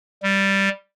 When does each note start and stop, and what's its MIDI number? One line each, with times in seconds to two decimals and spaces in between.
0.23 0.69 55